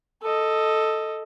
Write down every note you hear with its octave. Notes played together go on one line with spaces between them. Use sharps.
A4 D#5